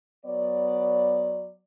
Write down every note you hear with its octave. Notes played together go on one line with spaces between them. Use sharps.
F#3 B3 C#5 D5